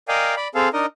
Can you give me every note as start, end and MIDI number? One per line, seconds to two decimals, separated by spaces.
0.08 0.35 70
0.08 0.35 74
0.08 0.35 75
0.08 0.35 77
0.08 0.35 79
0.08 0.35 80
0.37 0.48 74
0.37 0.48 83
0.55 0.69 60
0.55 0.69 68
0.55 0.69 69
0.55 0.69 77
0.73 0.86 62
0.73 0.86 63
0.73 0.86 70
0.73 0.86 75